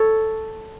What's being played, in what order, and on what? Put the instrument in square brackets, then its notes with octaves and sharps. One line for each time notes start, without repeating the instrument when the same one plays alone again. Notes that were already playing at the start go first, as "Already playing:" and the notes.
Already playing: [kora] A4 C#5